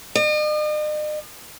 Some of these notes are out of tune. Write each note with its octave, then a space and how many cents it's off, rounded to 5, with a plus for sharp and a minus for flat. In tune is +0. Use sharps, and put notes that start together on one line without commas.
D#5 -45